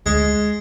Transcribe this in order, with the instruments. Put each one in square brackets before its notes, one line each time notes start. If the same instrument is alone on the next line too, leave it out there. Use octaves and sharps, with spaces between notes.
[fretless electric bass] D2 [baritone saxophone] G#3